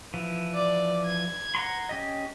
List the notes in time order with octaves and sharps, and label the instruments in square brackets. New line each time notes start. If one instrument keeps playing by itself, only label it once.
[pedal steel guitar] E3 F3
[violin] D5
G#6
[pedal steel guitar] F#5 A#5 C6
C#4 G4 D#5